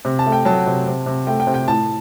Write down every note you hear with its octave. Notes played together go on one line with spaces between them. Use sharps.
C3
A5
A3
G5
F#3 A5
C3
C3
C3
A3 G5
G5
C3
G5
A2 A5